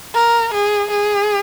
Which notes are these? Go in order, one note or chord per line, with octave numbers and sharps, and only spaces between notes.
A#4
G#4
G#4